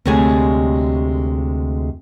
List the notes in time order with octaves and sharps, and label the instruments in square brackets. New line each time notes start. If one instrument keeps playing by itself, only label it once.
[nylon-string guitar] D2 C3 G3 G#3 C#5 G#5